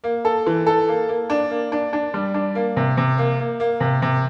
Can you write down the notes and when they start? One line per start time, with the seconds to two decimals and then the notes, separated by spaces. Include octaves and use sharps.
0.04 A#3
0.25 A4
0.47 E3
0.67 A4
0.88 A#3
1.09 A#3
1.30 D4
1.50 A#3
1.72 D4
1.93 D4
2.14 G3
2.34 D4
2.55 A#3
2.77 C3
2.97 C3
3.18 A#3
3.39 A#3
3.60 A#3
3.80 C3
4.02 C3